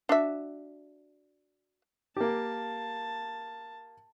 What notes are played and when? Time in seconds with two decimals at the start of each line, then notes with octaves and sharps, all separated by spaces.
0.09 D4 F#4 E5
2.17 A#3 G4 A5